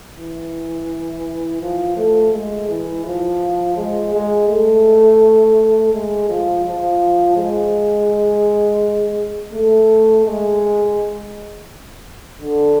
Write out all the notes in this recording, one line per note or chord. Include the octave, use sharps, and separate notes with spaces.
E3
F3
A3
G#3
E3
F3
G#3
G#3
A3
G#3
F3
F3
G#3
A3
G#3
D3